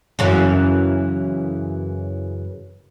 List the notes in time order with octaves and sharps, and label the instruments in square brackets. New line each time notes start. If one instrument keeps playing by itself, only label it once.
[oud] F#2 C#3 E3